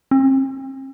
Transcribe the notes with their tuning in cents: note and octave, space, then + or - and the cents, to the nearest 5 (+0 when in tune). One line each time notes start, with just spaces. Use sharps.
C4 +40